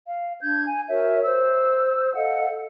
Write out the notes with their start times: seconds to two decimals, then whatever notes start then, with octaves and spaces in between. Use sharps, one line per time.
0.08 F5
0.42 D4 G6 G#6
0.66 G#5
0.89 F#4 A#4 C#5 E5
1.23 C5 E6
2.15 A4 D#5 F5 F#5